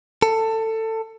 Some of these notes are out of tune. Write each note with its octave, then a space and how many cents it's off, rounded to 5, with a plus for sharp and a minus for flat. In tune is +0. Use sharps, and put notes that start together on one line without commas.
A4 +20